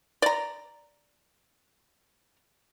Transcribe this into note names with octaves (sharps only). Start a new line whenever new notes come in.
D5 A#5